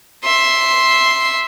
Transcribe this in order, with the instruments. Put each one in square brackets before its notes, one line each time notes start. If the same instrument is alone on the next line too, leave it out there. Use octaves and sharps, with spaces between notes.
[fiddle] E5 C6